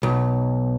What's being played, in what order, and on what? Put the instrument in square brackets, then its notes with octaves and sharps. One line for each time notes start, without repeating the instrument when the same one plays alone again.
[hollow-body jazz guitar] B1